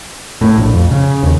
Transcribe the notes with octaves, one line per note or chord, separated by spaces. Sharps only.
A2
A#1
F2
C#3
D#2